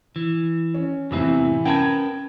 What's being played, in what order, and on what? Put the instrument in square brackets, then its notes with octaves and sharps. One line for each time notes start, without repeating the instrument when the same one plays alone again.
[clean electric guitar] E3
[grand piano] C#4
[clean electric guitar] E2 A2 C4 [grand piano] C3 E3 E4
[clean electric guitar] C#4 A#4 B4 [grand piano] G5 A5 G#6